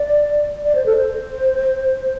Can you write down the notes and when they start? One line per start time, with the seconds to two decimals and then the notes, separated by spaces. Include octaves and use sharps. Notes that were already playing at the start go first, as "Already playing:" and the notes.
Already playing: D5
0.64 D5
0.75 C5
0.86 A4
0.97 C5